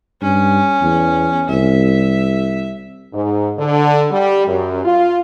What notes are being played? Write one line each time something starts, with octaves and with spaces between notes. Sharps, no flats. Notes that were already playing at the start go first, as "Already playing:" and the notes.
G2 C#4
E2
C2 E5
G#2
D3
G3
F#2
F4